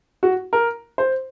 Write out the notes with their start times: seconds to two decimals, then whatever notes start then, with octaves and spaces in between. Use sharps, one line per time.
0.23 F#4
0.53 A#4
0.98 C5